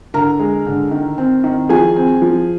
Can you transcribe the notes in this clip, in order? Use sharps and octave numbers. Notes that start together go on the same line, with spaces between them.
D3 A#4 A#5
G#3
D3
D#3
C4
D#3
F3 G#4 G#5
C4
F3